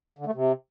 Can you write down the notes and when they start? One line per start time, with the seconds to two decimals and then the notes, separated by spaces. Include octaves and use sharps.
0.19 D3
0.26 A3
0.34 C3